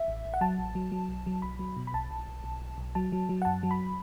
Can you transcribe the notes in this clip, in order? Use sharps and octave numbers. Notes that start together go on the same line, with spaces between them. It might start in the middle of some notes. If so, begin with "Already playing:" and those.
Already playing: E5
A1
A1
F#5
F#3 A5
A1
F#3
F#3
B1
F#3
B1 B5
F#3
B2
B5
B1 A5
B1
B1
B1
B1
B1
F#3 A5
F#3
F#3
F#5
F#2 A5
F#3
B5